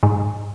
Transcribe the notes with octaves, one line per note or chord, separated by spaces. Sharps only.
G#2